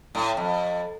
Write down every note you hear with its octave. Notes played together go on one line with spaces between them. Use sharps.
A2
F2